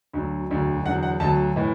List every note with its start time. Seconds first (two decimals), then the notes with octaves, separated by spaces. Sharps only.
0.13 D2 D3 F#3
0.50 E1 D2 D3 F#3
0.85 E2 D3 F#3 F#5
1.03 F#5
1.20 D2 D3 F#3 A5
1.56 A2 E3